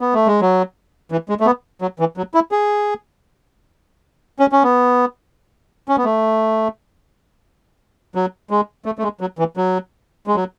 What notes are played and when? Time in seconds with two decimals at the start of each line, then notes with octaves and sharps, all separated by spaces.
0.01 B3
0.14 A3
0.27 G#3
0.41 F#3
1.12 E3
1.29 G#3
1.40 A3
1.46 B3
1.82 F#3
1.99 E3
2.17 F#3
2.34 E4
2.52 G#4
4.39 C#4
4.52 C#4
4.63 B3
5.89 C#4
5.97 B3
6.05 A3
8.15 F#3
8.50 G#3
8.86 A3
8.99 A3
9.03 G#3
9.21 F#3
9.39 E3
9.57 F#3
10.27 G#3
10.35 F#3